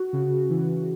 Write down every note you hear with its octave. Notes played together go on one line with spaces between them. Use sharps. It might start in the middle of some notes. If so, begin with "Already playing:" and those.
Already playing: F#4
C#3
E3